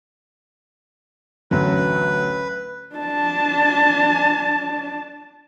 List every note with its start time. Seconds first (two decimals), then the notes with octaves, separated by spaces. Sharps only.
1.51 A1 D2 F#3 B4
2.95 D4 A5